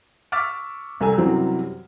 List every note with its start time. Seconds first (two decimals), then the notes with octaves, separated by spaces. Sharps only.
0.32 C#6 D6 E6 F6 A6 B6
1.00 C2 A4 G#5
1.18 F#2 C3 E3 F#3 G3 C4